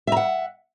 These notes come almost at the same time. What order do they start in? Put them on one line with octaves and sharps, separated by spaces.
E5 A#5 F#5